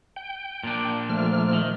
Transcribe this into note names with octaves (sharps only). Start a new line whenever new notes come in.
G5
A#2 D4
F3 A3 F6
D#3